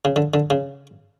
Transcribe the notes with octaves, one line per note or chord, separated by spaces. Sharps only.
C#3
D3
D3
C#3